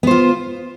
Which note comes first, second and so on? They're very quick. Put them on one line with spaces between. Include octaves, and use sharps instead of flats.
B3 C5 F4